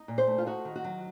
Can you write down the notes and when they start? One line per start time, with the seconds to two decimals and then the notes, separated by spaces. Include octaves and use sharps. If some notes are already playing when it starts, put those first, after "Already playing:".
Already playing: D#4
0.08 A#2
0.18 C5
0.28 A3
0.38 F4
0.46 D#4 F#4
0.65 D#3
0.76 F#4
0.84 F#3